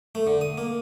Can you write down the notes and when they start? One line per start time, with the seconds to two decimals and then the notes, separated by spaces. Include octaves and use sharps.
0.15 A3
0.27 D3
0.41 D#6
0.58 A#3